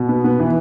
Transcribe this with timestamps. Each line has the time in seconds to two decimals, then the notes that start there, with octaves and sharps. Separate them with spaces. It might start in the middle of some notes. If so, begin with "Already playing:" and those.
Already playing: B2
0.09 B3
0.24 B3
0.39 E3